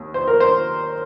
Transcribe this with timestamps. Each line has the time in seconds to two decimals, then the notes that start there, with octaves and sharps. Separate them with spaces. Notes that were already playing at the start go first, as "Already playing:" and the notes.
Already playing: D#2
0.14 C5
0.27 A#4
0.40 C5